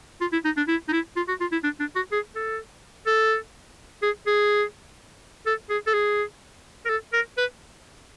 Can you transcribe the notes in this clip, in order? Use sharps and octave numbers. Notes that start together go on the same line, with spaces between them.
F4
E4
D#4
D4
E4
D#4
E4
F4
F#4
F4
E4
D4
D4
F#4
G#4
A4
A4
G#4
G#4
A4
G#4
A4
G#4
A#4
A4
A#4
B4